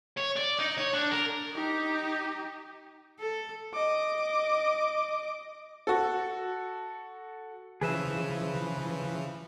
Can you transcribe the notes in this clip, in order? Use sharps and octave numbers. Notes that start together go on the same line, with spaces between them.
C#5
D5
D#4
C#5
D4
A#4
D#4 G4
A4
D#5 D6
F#4 A4
C#3 E3 F3 G#4 B4 E5